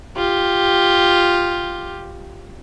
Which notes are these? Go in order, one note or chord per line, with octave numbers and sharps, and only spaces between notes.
F4 G4